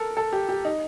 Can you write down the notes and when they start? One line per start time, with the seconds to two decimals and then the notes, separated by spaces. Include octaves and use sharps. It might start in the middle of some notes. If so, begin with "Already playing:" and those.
Already playing: A4 A#4
0.17 A4
0.33 G4
0.49 G4
0.65 D#4